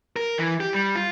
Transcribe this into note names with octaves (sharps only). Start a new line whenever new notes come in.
A#4
E3
G4
G3
F4